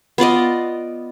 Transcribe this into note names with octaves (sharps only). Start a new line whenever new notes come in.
B3 F4 D5 D#5